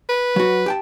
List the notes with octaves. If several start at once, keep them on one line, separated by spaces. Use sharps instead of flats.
B4
F#3 F#4
G4 G5 A5